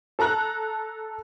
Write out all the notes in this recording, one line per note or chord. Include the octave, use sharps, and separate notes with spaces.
A4 A5 A#5 F#6